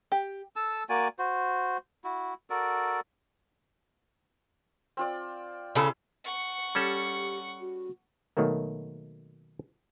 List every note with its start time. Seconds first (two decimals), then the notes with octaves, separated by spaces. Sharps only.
0.12 G4
0.56 A4 A5 E6
0.89 A#3 F#4 D5 G#5
1.19 F#4 C5
2.04 E4 F#4
2.50 F#4 A4 A#4 D5
4.97 C4 F4 D5
5.75 C#3 B3 E4 A4
6.24 F#5 C#6
6.75 G3 C#4 G4 A4
7.60 F#4
8.37 B2 D#3 F#3 A3 A#3